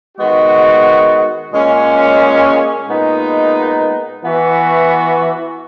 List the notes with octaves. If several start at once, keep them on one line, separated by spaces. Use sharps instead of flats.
D#3 G#3 B3 F#4
A#2 G#3 C#4
A#2 G#3 B3 D#4
E3 B3 F#4